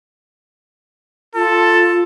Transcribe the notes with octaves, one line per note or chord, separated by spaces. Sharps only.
F4 A4